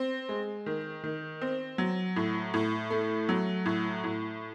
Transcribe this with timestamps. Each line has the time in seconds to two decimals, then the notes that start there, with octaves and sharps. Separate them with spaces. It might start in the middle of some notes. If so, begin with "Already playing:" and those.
Already playing: C4
0.29 G#3
0.66 D#3
1.03 D#3
1.42 C4
1.78 F#3
2.16 A2
2.54 A2
2.90 A3
3.29 F#3
3.66 A2
4.04 A2